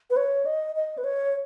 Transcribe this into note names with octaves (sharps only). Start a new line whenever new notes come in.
B4
C#5
D#5
D#5
B4
C#5